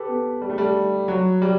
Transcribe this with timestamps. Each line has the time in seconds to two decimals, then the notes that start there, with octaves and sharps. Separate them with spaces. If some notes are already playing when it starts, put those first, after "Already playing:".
Already playing: G4 A4 B4
0.08 B3
0.42 G3
0.50 A3
0.58 G3
1.08 F#3
1.42 G3